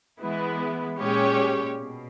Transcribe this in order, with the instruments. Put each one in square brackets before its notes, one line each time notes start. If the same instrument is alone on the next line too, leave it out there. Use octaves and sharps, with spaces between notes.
[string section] E3 G#3 B3 E4
A#2 G#3 C#4 G4 C#5
B2